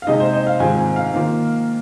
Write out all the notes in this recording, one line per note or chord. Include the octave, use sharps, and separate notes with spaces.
F5
C3 G#3 D#4 D#5
C5
D#5
F5
G#2 D#3 C4 F4 G#5
G#5
F5
D#3 A#3 F4